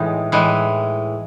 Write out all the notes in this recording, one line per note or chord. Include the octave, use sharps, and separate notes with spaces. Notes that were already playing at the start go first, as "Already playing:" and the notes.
Already playing: A2 E3 G#3 D#4
A2 E3 G#3